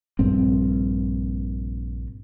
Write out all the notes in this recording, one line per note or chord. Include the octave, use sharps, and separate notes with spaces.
A#1 G2 C4